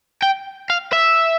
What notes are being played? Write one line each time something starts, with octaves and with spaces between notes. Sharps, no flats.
G5
F5
E5